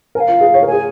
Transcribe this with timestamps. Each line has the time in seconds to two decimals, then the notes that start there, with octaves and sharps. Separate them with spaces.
0.15 A#4 G#5
0.20 F5
0.28 F4
0.41 G#4
0.54 C#5
0.63 A#4 G#5
0.72 G#4